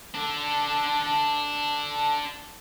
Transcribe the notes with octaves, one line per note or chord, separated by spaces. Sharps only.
D4 A4